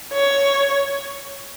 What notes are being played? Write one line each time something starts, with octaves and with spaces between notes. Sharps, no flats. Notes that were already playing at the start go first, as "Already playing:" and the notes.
C#5